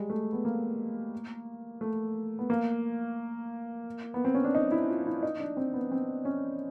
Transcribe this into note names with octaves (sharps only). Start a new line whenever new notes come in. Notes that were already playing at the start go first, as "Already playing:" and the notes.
Already playing: G3 G#3
A3
B3
A#3
A3
B3
A#3
B3
C4
C#4
D4
D#4
E4
F4
E4
D#4
D4
C4
B3
C4
C#4